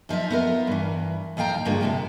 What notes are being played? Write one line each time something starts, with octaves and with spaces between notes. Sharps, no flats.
F#2 F3 D#4 E5
B3 F4 A#4
G2 E3
D#2 F3 F5 G5 A#5
G2 D3 G#3 A#3 F4
F#2 C3 A5